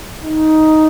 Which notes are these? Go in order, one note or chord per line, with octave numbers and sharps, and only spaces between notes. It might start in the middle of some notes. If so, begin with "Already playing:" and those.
D#4